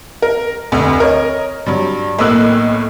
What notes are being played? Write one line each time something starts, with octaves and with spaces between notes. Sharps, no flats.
A#4
F1 D2
A#4 C#5 D#5
G2 F#3
B1 A2 A#3 E6 F#6